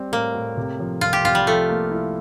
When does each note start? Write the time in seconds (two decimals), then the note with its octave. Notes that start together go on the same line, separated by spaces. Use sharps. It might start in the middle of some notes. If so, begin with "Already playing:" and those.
Already playing: G3 C4
0.12 A2 A#3
0.35 A2
0.57 C3
0.80 F3
1.01 C2 F4
1.13 G4
1.24 C2 F4
1.35 G3
1.47 F3 A3
1.69 A#3
1.91 E4